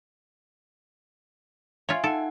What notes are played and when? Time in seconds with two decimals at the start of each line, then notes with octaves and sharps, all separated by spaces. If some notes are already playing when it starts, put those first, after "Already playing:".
1.89 F4 C#5 E5 G#5
2.04 D#4 A4 F#5